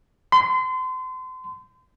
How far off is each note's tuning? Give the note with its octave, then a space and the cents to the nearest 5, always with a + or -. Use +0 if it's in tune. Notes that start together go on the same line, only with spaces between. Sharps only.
C6 -35